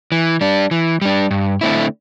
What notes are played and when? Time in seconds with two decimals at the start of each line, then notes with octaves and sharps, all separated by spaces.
0.12 E3
0.41 G3 D4
0.71 E3
1.02 G3 D4
1.31 G2
1.61 D3 A3 C4 E4